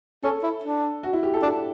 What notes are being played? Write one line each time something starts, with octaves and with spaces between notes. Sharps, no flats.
C#4 A4
E4
D4
F#4
E4
G4
A4
D4 G4